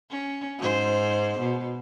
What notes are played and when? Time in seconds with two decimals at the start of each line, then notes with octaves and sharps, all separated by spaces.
0.11 C#4
0.59 G#2 C5
1.39 B2